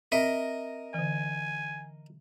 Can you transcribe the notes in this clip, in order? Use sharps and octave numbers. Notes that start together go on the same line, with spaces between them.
C4 A#4 D#5 E5
D3 E3 G#5